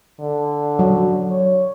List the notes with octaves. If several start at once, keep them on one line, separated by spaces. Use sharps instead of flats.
D3
F#3
C#5